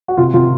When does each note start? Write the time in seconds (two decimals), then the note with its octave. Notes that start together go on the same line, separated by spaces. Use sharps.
0.08 F#4
0.17 C3 F4
0.34 C3 F4